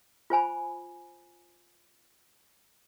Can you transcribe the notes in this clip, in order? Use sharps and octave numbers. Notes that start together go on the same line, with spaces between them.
F4 C5 G#5 B5